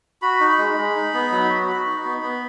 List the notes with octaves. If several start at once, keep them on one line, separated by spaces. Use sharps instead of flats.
F#4 B5
D#4
G#3
G#3
D#4
B3
F#3
F#4
F#4
D#4
B3
B3